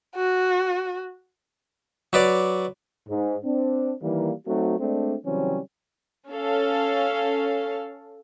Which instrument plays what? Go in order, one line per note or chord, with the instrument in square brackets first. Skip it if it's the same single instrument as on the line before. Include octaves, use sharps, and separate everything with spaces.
[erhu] F#4
[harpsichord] F#3 B4 D5 D6
[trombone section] G#2
C4 D4
D#3 E3 G3 A#3
F#3 A3 C4 D#4 F#4
G#3 A3 C4 D4
C#3 E3 F#3 G3 C4 C#4
[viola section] C#4 A4 F5